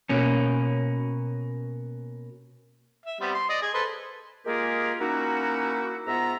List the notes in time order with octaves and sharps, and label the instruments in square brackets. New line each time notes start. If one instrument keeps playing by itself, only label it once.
[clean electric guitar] B2 A#3 C#4
[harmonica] E5
G3 B3 C4
C6
D5 D#5
G#4 G#5
A4 B4 C5
[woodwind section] G#3 A#3 F4 G4 G#4 A#4
A#3 C#4 D#4 E4 F#4
G#2 B3 F4 E5 A#5